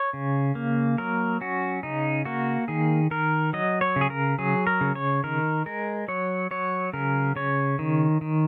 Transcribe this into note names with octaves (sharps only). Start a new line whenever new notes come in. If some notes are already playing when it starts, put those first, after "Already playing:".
Already playing: C#5
C#3
A#3
F#3 A#4
C#4 F#4
C#3 D#4
A#3 F#4
D#3 G#4
D#3 A#4
F#3 D#5
C#5
C#3
G#4
A#4
F#3 G#4
A#4
C#3
C#5
D#3 A#4
G#3 A#4
F#3 C#5
F#3 C#5
C#3 A#4
C#3 C#5
D#3
D#3